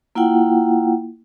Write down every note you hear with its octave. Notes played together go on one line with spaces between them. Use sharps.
A#3 E4 F4 F#5 G5